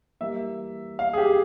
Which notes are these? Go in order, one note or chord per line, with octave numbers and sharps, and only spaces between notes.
E3 G3 A#3 E5
F5
G#4
G4